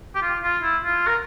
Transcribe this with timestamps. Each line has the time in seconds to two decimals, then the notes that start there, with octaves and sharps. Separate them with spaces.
0.15 G4
0.22 F4
0.43 F4
0.63 E4
0.84 F4
1.07 A#4